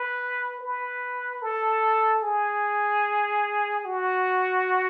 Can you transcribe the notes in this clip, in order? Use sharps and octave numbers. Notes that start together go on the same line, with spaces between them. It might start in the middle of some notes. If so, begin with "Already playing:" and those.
Already playing: B4
B4
A4
G#4
F#4